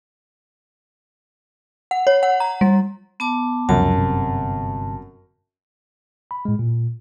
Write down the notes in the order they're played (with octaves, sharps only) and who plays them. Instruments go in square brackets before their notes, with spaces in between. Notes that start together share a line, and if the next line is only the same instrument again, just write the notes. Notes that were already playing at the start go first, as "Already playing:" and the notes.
[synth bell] F#5
C#5
F#5
A#5
G3
[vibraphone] B3 A5 D6
[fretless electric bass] C#2 C3 F3 [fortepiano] F#2 [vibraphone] A5
[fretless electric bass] G1 C3
[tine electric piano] B5
A2 G#3
A#2